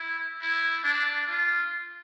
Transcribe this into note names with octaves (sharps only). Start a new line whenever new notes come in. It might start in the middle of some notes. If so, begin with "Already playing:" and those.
Already playing: E4
E4
D4
F4